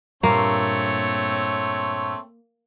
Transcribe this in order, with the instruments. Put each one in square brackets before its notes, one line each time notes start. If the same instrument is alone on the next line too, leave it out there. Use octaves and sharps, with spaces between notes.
[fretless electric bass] G2 A#2 [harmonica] A3 C4 C#5 [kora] A#3